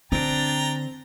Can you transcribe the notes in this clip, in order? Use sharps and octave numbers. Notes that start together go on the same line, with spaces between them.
D3 C4 D4 G5 A#5 A6 D7